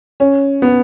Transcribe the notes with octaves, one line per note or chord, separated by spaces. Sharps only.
C#4
B3